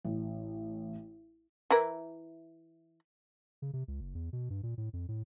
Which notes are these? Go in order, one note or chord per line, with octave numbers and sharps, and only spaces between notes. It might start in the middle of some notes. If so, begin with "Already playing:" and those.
A1
E3 E4 A#4
C#3
C3
C#2
F#1
E2
B2
G2
A#2
A2
F2
A2